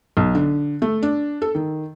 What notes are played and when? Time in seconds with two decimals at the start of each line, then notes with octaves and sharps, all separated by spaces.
0.17 B1
0.35 D3
0.82 A3
1.03 D4
1.42 A4
1.55 D#3